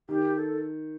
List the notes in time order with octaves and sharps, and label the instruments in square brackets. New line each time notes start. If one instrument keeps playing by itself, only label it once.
[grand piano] D#3 [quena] G4
[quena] A4